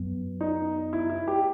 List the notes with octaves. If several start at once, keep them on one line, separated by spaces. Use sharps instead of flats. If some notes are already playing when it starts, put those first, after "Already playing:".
Already playing: F#2 F#3 B3
D#4
E4
E4
G4